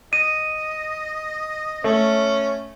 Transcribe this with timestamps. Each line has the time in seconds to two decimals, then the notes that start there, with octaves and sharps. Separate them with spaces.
0.13 D#5 D#7
1.84 A3 C#4